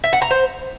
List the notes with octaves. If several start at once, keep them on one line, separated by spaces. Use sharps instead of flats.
E5
F#5
A#5
C5